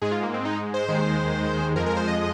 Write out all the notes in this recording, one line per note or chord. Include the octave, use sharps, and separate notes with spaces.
G#2 G#3 G#4
F4
A#3
C4
D#4
C5
D#2 D#3 G#3
F2 F3 G#3 A#4
A#4
C5
D#5